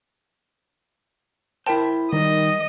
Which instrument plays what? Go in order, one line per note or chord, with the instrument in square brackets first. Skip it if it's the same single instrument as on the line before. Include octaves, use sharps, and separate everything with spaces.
[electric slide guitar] E4 C5 [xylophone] A#4 G5 A5
[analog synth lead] D#3 [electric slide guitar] G3 [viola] D#5